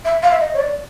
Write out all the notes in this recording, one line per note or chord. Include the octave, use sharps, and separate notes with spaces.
E5
F5
E5
D#5
C#5
D5